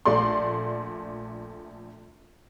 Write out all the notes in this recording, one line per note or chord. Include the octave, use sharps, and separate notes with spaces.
A#1 A3 D5 C6